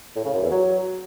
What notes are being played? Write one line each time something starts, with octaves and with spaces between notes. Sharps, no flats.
A2
C#3
F#2
E2
F#3